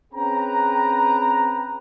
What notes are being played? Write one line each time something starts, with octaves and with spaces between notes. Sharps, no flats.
C4 C#4 G#4 B4 G5 A#5